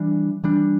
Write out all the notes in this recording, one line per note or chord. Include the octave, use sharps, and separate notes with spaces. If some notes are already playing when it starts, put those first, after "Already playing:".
Already playing: E3 G3 D4
E3 G3 D4